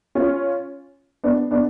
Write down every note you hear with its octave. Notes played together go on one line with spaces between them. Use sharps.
C#4 F4
B3 D4
B3 D4